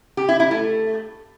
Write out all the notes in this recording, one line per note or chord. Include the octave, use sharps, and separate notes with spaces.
G4
E4
E4
A3